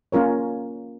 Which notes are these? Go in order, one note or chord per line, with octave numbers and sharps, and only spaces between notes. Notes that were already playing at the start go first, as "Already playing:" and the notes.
A#3 C#4 F4 A#4 C#5